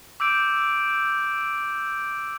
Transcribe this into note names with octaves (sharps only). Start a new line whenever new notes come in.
D6 E6 G6 D7